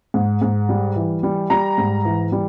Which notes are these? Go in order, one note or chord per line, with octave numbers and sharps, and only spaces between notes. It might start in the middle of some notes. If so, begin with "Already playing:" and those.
G#2
G#2
G3
E3
G3
G3 A#5
G#2
E3
G3